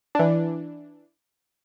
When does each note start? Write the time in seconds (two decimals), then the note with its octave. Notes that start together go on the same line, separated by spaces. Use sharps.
0.15 E3 D4